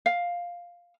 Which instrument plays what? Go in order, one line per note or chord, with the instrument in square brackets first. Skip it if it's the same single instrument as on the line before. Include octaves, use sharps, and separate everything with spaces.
[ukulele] F5